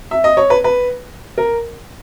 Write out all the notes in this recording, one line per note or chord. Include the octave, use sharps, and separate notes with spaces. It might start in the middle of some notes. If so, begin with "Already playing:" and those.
E5
D#5
C#5
B4
B4
A#4